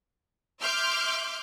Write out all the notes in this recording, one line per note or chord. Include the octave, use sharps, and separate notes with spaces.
E5 C6 D6 F6 G6